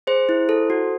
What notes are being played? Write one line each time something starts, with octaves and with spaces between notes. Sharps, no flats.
G#4 C5
E4
A4
F#4